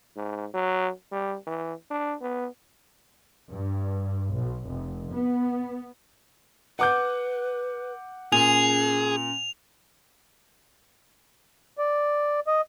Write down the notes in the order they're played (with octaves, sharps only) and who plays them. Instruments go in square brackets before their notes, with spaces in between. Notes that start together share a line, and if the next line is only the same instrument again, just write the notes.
[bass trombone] G#2
F#3
G3
E3
D4
B3
[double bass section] G2
B1
F1
B3
[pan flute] B4 [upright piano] F#5 D6 G6
[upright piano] A#2 [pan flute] C#4 [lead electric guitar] G#4 [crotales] F7
[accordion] D5
D#5